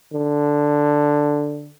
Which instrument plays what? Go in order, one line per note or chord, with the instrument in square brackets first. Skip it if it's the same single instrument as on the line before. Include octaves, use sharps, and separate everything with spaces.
[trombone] D3